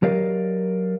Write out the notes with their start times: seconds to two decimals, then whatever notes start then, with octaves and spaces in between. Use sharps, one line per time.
0.03 F#3 G4 A#4 D5 D#5 F5